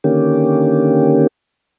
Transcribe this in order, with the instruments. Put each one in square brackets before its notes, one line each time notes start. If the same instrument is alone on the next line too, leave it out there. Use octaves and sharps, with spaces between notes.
[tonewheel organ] D3 D#3 A#3 C#4 G4